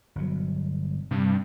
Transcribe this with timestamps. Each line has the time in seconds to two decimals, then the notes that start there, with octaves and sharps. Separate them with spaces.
0.16 G1 B2 F#3
1.11 G2 C3